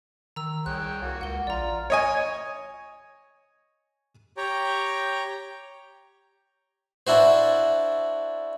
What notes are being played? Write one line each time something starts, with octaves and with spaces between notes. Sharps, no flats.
D#3 A#5 E6
C2 G#4 C#5 G5 F#6
A#3 F#4
C#2 F#5 G7
A#1 F4 D5 A#5
C#5 D#5 G#5
G4 C#5 G5 A#5
D4 E4 F#4 C5